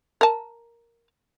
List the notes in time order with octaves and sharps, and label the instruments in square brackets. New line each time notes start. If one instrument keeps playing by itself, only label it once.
[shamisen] A#4 A5